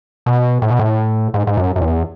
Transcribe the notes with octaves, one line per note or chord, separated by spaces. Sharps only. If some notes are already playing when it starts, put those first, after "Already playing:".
B2
A2
B2
A2
G#2
G#2
F#2
F#2
E2